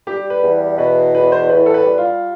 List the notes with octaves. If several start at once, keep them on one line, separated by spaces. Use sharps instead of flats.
G3 G4
B4
E2
B2 B4
E2 B4
C5
A2 B4
A4
B4
G3
F4